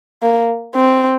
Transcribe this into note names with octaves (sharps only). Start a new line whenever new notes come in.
A#3
C4